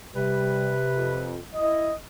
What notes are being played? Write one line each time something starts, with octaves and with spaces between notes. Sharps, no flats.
C3 G3 B4
F2
E4 D#5